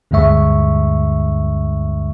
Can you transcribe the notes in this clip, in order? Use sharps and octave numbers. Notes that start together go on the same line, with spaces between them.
D2 G2 D3 G#3 E5 C#6